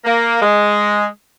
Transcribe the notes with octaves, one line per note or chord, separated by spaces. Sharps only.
A#3
G#3